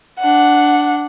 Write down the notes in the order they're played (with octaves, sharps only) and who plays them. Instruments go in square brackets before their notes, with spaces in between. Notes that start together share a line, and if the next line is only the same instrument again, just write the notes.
[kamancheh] D4 F#5